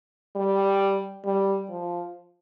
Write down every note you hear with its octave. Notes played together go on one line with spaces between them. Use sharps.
G3
G3
F3